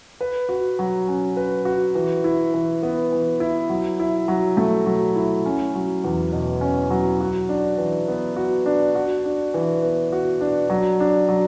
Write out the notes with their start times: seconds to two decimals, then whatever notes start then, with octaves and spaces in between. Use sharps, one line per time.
0.21 B4
0.49 F#4
0.79 F#3
1.08 C#4
1.37 B4
1.65 F#4
1.95 E3
2.24 E4
2.54 E3
2.83 B3
3.12 E3
3.40 E4
3.69 F#3
4.00 E4
4.28 F#3
4.57 A3
4.86 F#3
5.16 E4
5.46 C#4
5.75 F#3
6.04 E2
6.33 B2
6.61 C#4
6.90 F#3
7.21 F#4
7.49 D4
7.78 E3
8.08 B3
8.36 F#4
8.66 D4
8.95 F#4
9.25 D4
9.54 E3
9.83 B3
10.12 F#4
10.41 D4
10.70 F#3
11.00 D4
11.28 F#3